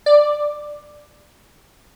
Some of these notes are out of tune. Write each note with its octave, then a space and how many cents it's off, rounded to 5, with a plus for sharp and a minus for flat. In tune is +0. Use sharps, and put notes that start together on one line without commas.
D5 +5